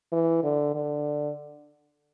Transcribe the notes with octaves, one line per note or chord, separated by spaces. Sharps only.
E3
D3
D3